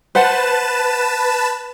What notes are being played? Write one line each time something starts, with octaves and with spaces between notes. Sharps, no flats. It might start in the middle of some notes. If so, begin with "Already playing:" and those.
B4 C5 F#5 A5 E7